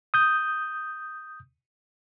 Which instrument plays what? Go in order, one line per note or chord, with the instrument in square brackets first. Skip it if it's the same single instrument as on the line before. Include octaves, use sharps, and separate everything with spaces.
[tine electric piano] D#6 G6